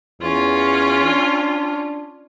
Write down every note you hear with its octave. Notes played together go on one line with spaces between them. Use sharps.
E2 C#4 F4
D4